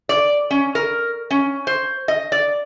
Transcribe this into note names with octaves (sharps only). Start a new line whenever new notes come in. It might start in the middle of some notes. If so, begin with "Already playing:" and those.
D5
C#4
A#4
C#4
C5
D#5
D5